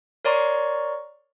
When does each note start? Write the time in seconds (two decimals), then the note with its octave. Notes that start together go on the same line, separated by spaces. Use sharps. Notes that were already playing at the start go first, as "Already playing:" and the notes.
0.25 A#4 C#5 D5 A#5 C6 C#6